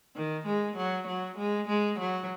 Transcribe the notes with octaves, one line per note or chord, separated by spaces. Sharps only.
D#3
G#3
F#3
F#3
G#3
G#3
F#3